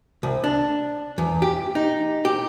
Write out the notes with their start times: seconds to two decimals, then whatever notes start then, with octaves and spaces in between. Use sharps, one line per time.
0.23 C2
0.44 D4
1.18 E2
1.42 G4
1.75 D#4
2.25 G4